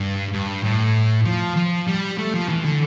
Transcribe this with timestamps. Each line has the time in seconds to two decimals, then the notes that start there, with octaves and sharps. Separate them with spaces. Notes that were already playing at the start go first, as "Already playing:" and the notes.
Already playing: G2
0.33 G2
0.64 A2
1.26 F3
1.56 F3
1.87 G3
2.18 A3
2.34 F3
2.49 E3
2.64 D3